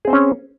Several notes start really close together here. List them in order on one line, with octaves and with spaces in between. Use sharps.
G#4 C4 C5 C#4